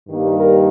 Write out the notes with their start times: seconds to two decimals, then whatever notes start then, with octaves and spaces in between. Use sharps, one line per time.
0.08 G2 D#3 G3 A#3
0.37 A#4